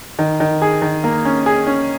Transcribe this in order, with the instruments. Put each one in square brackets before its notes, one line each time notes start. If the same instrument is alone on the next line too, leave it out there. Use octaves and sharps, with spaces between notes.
[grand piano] D#3
D#3
G#4
D#3
A#3
C#4
G#4
C#4